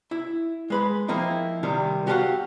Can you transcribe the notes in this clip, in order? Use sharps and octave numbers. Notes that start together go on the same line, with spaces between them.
E4
G#3 B4 B5
F3 A#3 C4 D#4 E4
C2 C3 D#3 G3
F#4 G4 A4 B4 F5 F#5